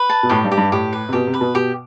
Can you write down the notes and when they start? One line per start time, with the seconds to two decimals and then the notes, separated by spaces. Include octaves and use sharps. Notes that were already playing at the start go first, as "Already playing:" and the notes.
Already playing: B4
0.09 A5
0.23 B2
0.30 A2 G4
0.44 G2
0.51 G4
0.57 G2
0.72 A2 G4
0.93 B4
1.09 C3
1.13 B2 G4
1.27 C3
1.34 B4
1.41 B2
1.54 B2 G4